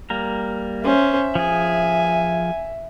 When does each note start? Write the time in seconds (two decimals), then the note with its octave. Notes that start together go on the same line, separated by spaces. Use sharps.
0.10 G3 A#3 A#4
0.84 C#4 C5 E5
1.35 F3 G#4 G#5